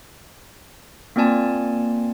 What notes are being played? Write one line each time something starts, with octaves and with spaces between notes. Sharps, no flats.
A#3 C4 F4 D5 G#5 A5